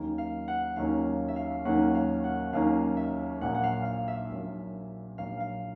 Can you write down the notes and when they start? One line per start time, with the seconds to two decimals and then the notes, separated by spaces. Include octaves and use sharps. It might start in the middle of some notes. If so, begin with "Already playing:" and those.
Already playing: D#2 D#3 F#3 A#3 C#4
0.18 F5
0.48 F#5
0.76 D#2 D#3 F#3 A#3 C#4 F5
1.28 E5
1.36 F5
1.65 D#2 D#3 F#3 A#3 C#4 F#5
1.95 F5
2.24 F#5
2.53 D#2 D#3 F#3 A#3 C#4 F5
2.97 E5
3.41 A#1 A#2 F#3 A#3 F#5
3.55 F#5
3.63 F5
3.85 F5
4.08 E5
4.29 A#1 A#2 F#3 A#3
5.18 A#1 A#2 F#3 A#3 F5
5.40 F5